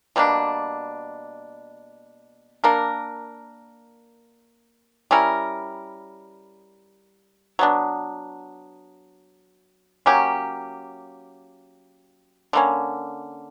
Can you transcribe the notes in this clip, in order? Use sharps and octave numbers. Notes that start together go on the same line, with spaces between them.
B2 G3 A#3 D4
A#3 D4 A#4
G3 C#4 E4 A#4
F#3 B3 D4
F#3 A#3 C#4 G4
D3 A#3 C#4